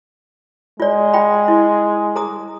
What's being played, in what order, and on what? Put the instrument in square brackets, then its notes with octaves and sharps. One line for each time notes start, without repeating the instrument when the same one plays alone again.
[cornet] G#3 [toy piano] F4 D5
[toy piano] F4 G5 B5
E4
G#4 A#5 D#6